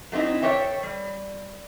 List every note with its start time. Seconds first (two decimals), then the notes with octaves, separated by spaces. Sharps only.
0.12 F#3 A3 C4 D#4 E4
0.42 A4 A#4 C5 C#5 E5 G5
0.83 G3